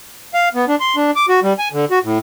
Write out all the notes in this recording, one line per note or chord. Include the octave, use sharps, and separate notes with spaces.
F5
B3
D4
C6
D4
D6
F#4
G3
G#5
D3
F#4
A2